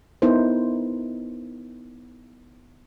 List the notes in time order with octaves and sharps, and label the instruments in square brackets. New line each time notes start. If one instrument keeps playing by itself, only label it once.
[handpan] B3 D#4 E4 A#4 C5